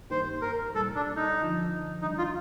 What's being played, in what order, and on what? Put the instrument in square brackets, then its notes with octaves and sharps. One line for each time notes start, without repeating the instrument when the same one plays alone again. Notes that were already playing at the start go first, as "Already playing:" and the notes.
[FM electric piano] G2 D#3 A#3 D#4 G4 [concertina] C5
[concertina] A#4
[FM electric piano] C2 A#2 G3 [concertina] A4
[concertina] D4
D#4
[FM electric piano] G1 F2 D3 F3
[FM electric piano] D#2 D#3 G3 D4 [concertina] D#4
[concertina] F4